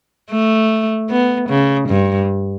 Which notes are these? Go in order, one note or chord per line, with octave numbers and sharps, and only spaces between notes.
A3
B3
C#3
G2